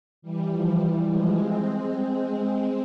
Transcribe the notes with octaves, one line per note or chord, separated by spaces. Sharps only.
E3 G3
F3
E3 G3
F3 G#3
G#3 C4